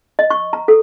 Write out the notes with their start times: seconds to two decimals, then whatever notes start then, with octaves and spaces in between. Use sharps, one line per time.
0.19 D#5
0.30 C#6
0.53 A#5
0.68 A4